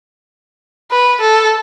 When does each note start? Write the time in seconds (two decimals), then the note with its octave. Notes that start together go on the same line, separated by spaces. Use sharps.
0.91 B4
1.21 A4